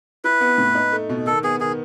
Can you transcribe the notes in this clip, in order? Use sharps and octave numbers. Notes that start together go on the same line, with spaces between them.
E4 B4
B3
A2
D#4
A3
B2
D#3 A4
B3 G#4
D#3 G#4